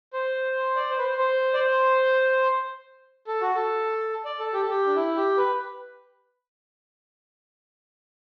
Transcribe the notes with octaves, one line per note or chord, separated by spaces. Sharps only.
C5
D5
C5
B4
C5
C5
D5
C5
A4
F#4
A4
D5
A4
G4
A4
G4
D4
E4
G4
B4